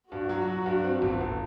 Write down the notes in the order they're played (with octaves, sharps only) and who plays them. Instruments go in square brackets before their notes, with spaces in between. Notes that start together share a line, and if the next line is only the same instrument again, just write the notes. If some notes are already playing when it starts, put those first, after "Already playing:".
[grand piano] G2 [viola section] F#4
[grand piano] F#3
F#3
G2
C4
G1
G1